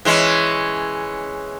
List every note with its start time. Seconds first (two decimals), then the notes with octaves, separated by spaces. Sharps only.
0.05 E3 G#3 C#4